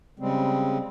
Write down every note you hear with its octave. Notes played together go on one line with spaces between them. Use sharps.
C#3 G3 G#3 C4